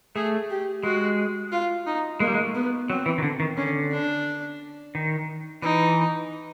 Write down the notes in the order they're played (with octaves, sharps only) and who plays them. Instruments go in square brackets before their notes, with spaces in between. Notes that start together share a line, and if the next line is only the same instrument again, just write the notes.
[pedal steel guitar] A3 [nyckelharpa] G#4
[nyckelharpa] G4
[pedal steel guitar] G#3 [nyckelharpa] F#4
[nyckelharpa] F4
D#4
[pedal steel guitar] G#3 [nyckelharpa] A#3
[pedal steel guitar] G3
G#3
A3
[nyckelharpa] B3
[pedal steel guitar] F#3 [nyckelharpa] C4
[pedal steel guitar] E3
D#3
D3
D#3
[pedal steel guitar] D3 [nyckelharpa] C#4
[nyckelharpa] D4
[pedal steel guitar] D#3
[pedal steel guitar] E3 [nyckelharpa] D#4